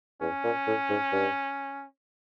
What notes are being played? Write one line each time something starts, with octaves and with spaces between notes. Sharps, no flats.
E2 C#4
A#2
A2
G#2
G2